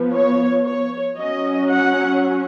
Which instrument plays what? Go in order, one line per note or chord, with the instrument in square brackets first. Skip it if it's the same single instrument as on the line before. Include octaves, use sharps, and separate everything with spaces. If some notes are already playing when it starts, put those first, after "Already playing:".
Already playing: [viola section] F3 B3
C#5
C#5
F#3 C#4 D#5
F#5